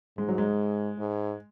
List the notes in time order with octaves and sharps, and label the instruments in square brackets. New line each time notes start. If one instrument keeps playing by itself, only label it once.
[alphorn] G#2 [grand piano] G#3
[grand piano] F#3
G#3
[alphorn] G#2